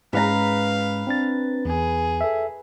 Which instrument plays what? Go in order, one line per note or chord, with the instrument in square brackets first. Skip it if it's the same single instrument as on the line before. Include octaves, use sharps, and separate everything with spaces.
[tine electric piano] G#2 G#3 C#4 [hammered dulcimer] B4 A#5 [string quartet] F5
[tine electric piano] C4 D4 A6
[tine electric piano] E2 [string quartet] G#4
[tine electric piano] A4 E5